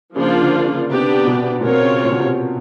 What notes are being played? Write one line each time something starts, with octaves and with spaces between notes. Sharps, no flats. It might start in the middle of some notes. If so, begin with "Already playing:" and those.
C#3 F3 A#3 D4 F4
D3
C#3
C3 B3 D4 G4 B4
B2
A#2
B2 C4 F4 A#4 C#5
C#3
A#2
B2
C3